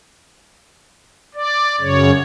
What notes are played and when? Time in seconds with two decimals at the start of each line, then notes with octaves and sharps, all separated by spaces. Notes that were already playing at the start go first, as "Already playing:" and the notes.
1.35 D5
1.81 F#2 C#3 C#5